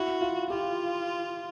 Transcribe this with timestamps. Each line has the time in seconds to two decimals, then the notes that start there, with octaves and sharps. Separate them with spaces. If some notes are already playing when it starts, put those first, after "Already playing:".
Already playing: E4 F#4
0.21 F4
0.50 F4 G4